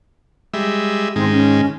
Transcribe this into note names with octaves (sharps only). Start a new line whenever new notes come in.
G3 G#3 E5
G#2 D#3 G#3 C4
C#4